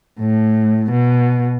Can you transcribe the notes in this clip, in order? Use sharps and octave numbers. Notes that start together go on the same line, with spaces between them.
A2
B2